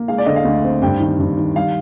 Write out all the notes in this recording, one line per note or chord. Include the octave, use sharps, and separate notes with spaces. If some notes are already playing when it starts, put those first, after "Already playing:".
Already playing: A#3
G#3 F5
D5
D3 D#5
F5
D2
C4
G2 G5
D#3
G2
D#3
G3 F5